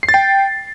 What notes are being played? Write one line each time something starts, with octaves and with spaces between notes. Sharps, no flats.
C7
A6
G5